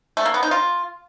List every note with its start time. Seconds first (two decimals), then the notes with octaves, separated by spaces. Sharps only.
0.17 A3
0.26 A#3
0.34 B3
0.43 D#4
0.51 F4